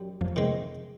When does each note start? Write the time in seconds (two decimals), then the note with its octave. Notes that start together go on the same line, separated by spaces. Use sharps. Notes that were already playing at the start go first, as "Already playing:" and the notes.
Already playing: F#2 G3
0.21 F2 F3
0.36 C3 D#3 G#3 C4